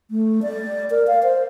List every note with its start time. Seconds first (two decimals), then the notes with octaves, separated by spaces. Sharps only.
0.11 A3
0.42 D5
0.90 A#4
1.07 F5
1.23 C5